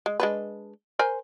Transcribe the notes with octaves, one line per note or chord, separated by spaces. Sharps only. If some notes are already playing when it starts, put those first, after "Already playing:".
G#3
G#3 D4 B4
A#4 C5 G#5